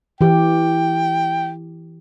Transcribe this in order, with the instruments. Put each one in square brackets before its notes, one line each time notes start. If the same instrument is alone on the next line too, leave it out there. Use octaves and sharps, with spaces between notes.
[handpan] E3 G4 [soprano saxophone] G5